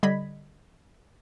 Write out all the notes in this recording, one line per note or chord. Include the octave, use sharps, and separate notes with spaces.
D3 G3 D#5 B5 G#6 B6